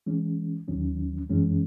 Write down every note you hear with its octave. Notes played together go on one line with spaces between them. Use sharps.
E3 G#3 C#4
D#2 D#3 F#3 C#4
F#2 E3 G#3 C#4